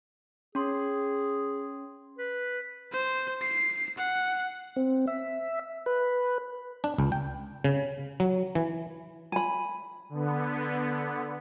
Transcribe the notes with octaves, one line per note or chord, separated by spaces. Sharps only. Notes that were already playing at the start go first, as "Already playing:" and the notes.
C#4 G#4 C6
B4
C5
C7
F#5
C4
E5
B4
D4
C#2
G5
C#3
F#3
E3
G#5 B5
D3 B3